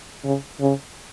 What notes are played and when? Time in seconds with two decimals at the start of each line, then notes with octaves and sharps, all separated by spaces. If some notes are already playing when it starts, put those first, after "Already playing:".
0.24 C#3
0.61 C#3